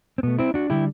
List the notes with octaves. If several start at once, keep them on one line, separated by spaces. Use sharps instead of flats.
C4
B2 A3 B3
C4 E4
D4 F#4
D3 G3 E4 G4